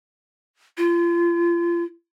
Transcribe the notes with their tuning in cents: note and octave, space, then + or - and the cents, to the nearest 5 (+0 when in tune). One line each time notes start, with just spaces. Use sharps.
F4 -35